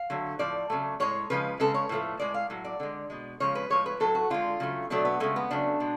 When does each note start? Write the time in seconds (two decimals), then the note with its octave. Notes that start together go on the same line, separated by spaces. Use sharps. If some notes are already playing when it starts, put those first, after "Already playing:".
Already playing: F5
0.10 D3 F#3 A3
0.39 A2 F3 D5
0.70 C#3 F#3 A3
1.00 A2 G#3 C#5
1.30 C#3 F3 G#3 B4
1.60 C#3 G#3 A4
1.74 C#5
1.89 A2 F3 A3
2.20 A2 G#3 D5
2.34 F5
2.50 A2 F#3
2.65 D5
2.80 D3 G#3
3.10 B2 G#3
3.40 C#3 F3 G#3 C#5
3.55 B4
3.70 A2 F3 G#3 C#5
3.86 B4
4.00 A2 F#3 A3 A4
4.15 F#4
4.30 D3 G#3 F4
4.60 C#3 F#3 A3
4.90 B2 F#3 A3 D4
5.05 B3
5.20 C#3 G#3 A3
5.36 B3
5.51 C#3 F#3 A3 D4
5.80 B2 G#3